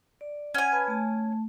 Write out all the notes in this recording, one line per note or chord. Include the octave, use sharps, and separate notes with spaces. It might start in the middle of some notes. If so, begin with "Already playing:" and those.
D5
C#4 F#5 G#5
B4 A5 B5
A3 A5